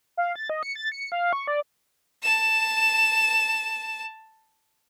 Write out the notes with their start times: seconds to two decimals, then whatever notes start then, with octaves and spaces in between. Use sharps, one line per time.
0.17 F5
0.36 A6
0.50 D#5
0.63 C#7
0.75 A6
0.92 C#7
1.12 F5
1.33 C#6
1.47 D5
2.23 A5 E7